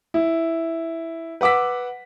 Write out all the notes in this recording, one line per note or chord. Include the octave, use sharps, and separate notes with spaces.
E4
B4 F#5 D6 E6 B6